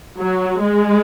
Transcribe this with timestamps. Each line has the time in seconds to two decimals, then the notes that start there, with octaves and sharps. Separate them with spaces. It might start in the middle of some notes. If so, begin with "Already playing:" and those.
0.18 F#3
0.62 G#3